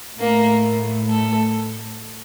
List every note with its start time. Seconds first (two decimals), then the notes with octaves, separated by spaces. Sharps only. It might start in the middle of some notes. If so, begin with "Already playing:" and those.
0.19 A2 A3 A#3 A#4
1.08 A3 A4